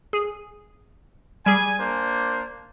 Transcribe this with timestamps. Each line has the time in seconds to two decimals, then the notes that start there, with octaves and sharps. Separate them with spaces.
0.13 G#4
1.46 G3 G#4 G#5
1.79 A#3 D4 C5